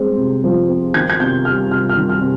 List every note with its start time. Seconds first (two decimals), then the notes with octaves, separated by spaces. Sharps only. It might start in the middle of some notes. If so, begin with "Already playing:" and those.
Already playing: G#3 C4
0.17 C3
0.44 F3
0.69 C4
0.94 D#3 G#6
1.10 G#6
1.20 C3 G6
1.45 G3 F6
1.71 C3 F6
1.89 F6
1.96 D#3
2.09 F6
2.21 C3